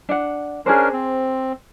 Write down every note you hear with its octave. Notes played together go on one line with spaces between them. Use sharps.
D4 F#5
C#4 D4 G#4 A#4 C5
C4